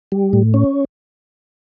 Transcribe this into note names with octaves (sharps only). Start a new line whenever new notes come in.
G3
A2
C#4